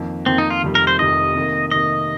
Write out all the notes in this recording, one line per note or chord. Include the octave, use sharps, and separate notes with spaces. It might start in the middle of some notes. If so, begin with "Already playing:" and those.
Already playing: F2 D#3 A#3
F2 D#3 A#3 C4
D#4
F4
F1 F2 D#3 G3
A#4
C5
F1 F2 D#3 G3 D#5
C3 D#3 A#3
C3 D#3 A#3 D#5